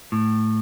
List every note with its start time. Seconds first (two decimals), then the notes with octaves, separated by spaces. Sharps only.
0.12 A2